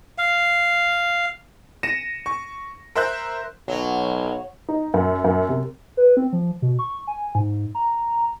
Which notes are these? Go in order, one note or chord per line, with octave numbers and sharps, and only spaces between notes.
F5
A#6 C#7 D#7 E7
C#6
A#4 C5 E5 F#6 G6
B1 F#3
D#4
F#2
F#2
C3
B4
C4
F3
B2
C#6
G#5
G#2
A#5